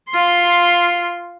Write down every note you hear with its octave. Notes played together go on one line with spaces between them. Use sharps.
F4 C6